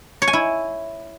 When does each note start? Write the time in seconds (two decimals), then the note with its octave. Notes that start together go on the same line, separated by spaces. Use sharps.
0.22 C#5
0.28 G#5
0.33 E4